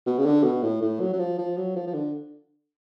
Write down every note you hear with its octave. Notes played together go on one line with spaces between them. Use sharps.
B2
C#3
D3
B2
A2
A2
F#3
F#3
F3
F3
F#3
F3
F3
D3